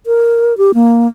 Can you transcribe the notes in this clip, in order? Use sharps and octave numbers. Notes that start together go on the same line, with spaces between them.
A#4
G4
A#3